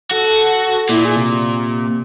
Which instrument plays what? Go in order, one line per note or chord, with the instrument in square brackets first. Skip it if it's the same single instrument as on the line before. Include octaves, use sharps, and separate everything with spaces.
[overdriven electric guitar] F#4 [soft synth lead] A4
[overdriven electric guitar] A#2 [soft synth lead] E4
[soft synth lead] G#4
C3